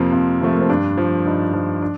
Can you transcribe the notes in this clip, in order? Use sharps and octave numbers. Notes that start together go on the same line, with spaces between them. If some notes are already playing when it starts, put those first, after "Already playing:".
Already playing: F2 C3 F3 A#3
F2
C3 F3 A3
A#3
C4
G2 D4
F3
G2 D#4
F3
D4